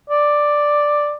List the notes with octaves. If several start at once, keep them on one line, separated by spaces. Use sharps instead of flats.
D5